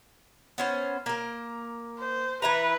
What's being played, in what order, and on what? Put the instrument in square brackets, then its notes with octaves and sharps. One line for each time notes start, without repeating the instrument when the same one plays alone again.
[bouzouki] B3 C#4 C5
A#3 A#4
[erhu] C5
[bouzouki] E3 E5 A#5 [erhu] B4